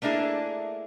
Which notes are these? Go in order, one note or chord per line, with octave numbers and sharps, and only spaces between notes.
A3 A#3 D4 E4 G#4